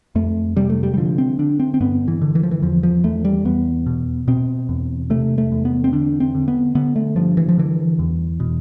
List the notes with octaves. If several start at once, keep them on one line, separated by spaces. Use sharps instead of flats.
F2 A3
C3 G3
A3
G3
G3
D3 F3
C4
D3 D4
C4
C4
G2 B3
E3
D3
E3
F3
E3
E2 F3
F3
E2 A3
G3
E2 B3
B2
B2 C4
E2
C3 A3
A3
E2
B3
C4
D3 D4
C4
D3
B3
D3 B3
A3
G2 F3
E3
F3
D3 E3
E2
B2